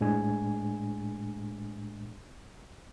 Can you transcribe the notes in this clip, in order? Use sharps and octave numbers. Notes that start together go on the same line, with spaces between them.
A2 G#3 D4 G#5